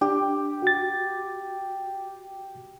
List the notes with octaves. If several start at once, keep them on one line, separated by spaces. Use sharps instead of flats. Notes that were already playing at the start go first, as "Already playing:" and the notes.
D4 G4
F#4 A6